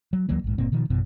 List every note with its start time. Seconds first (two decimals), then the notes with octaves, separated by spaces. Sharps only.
0.13 F#3
0.29 D2 E3 F#3 A#3
0.44 A#1 G#2
0.58 G1 A#2 A#3 C4
0.72 B2 D#3 F3
0.90 A1 F#2 B2 E3